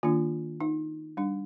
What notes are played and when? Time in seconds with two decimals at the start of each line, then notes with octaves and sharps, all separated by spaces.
0.03 D#3 A#3 D4 F4
0.61 D#4
1.17 G3 D4